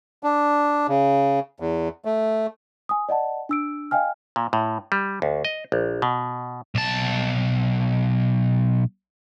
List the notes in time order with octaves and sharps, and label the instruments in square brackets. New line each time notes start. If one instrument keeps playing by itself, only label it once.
[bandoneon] D4
C#3
E2
A3
[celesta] G#5 D#6
D5 D#5 F#5 A5
D4 E6 D7
D#5 F5 G5 G#5 F6
[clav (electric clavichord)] A#2
A2
G3
D2
D#5
A#1
B2
[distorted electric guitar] B1 A5